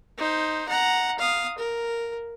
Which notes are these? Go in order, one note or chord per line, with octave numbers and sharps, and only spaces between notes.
D#4 C5
F#5 A#5
F5 D#6
A#4